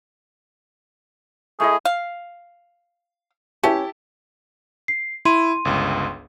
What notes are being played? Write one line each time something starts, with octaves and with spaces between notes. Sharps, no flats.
A3 E4 G#4 D#5
F5
C#4 E4 G4 A5
C7
E4 C6 D#7
G1 C#2